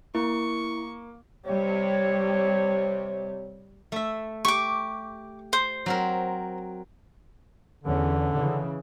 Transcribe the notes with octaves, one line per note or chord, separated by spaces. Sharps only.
A#3 E4 C#6
C3 G3 C#5
A3 E5
G4 C#6 D6
C5
F#3 C4 A#4
E2 D3 E3 C#4
C#3 E3